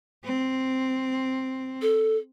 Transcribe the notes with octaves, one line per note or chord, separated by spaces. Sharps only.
C4
A4